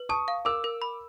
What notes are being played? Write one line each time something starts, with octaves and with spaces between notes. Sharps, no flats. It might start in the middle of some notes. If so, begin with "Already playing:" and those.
Already playing: B4
A5 C#6 D#6
F5
A#4 D6 E6
A#4
B5